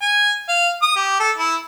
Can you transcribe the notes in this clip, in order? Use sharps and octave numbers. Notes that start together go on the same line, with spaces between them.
G#5
F5
D#6
G4
A4
E4